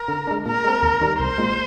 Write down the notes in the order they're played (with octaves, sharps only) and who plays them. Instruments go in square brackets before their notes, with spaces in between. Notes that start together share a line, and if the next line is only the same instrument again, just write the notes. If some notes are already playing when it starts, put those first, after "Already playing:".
Already playing: [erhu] A#4
[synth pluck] D3
G#3 D4
[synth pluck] A#2 [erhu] A#4
[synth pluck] G#3 C4
D#2
D#3 G3
[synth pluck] C2 [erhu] C5
[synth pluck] A#2 G#3